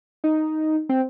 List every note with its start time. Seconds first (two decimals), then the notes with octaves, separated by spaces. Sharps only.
0.24 D#4
0.89 C4